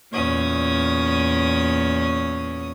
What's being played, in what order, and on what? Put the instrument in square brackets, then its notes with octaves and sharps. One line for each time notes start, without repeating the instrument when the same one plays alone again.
[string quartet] E2 A#2 C#4 D#6